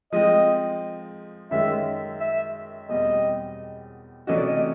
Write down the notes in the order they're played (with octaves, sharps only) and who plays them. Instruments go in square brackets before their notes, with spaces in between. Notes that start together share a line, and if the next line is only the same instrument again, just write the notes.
[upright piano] F3 G#3 C4 [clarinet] D#5
[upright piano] F#2 D#3 G#3 [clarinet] E5
[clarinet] E5
[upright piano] E2 B2 G3 C4 [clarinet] D#5
[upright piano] C3 E3 A3 C#4 F#4 [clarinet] D#5
[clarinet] D5
D#5